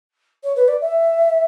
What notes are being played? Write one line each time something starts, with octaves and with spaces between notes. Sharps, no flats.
C#5
B4
D5
E5